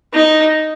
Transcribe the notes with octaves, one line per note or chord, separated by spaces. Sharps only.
D#4